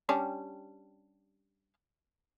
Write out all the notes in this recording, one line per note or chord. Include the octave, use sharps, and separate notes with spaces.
G3 C#4 D4